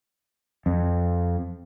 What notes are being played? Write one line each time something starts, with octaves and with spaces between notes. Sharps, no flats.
F2